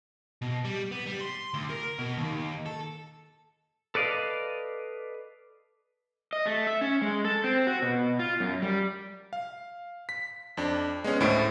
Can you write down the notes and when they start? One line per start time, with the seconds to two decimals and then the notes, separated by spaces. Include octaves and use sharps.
0.42 B2
0.65 G3
0.91 B3
1.06 G3
1.21 C6
1.54 D2
1.70 A#4
1.99 B2
2.17 D#2
2.66 A4
3.95 A4 B4 D5 D#5 F5
6.33 D#5
6.46 A3
6.67 E5
6.81 C#4
7.02 G#3
7.25 A4
7.44 C4
7.67 F#4
7.82 B2
8.19 F4
8.40 F#2
8.62 G3
9.33 F5
10.09 B6
10.57 F2 D4
11.04 G#3 B3 C#4
11.20 D2 A2 A3 E4 C5 D7